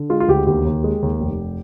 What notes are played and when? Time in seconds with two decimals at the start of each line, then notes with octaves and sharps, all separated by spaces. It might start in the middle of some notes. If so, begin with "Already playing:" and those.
Already playing: D3
0.10 G#3 F4
0.20 F4
0.28 D2 G4
0.46 D#2 G4
0.65 D#2
0.84 G#3
1.02 D#2
1.20 F1